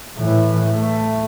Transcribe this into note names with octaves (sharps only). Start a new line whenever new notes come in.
A2 E3
A3